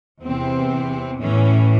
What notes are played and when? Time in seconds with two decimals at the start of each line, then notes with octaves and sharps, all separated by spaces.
0.22 E2 C3 E3 C4
1.20 A2 E3 C#4